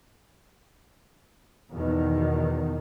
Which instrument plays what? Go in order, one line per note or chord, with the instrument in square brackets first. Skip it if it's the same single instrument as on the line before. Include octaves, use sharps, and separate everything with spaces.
[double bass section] E2 B2 D#3